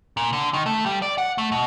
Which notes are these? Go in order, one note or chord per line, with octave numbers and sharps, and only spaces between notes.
A#2
D3
D#3
A3
G3
D5
F#5
A3
B2